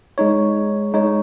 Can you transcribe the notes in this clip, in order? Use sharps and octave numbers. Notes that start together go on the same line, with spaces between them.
G#3 D#4 C#5
G#3 D#4 C#5